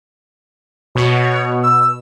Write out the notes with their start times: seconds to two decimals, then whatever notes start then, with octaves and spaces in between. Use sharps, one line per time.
0.95 B2 C#5
1.63 E6